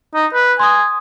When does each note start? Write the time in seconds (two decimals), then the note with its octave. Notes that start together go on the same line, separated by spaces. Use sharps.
0.15 D#4
0.34 B4
0.60 G#5 C6 D#6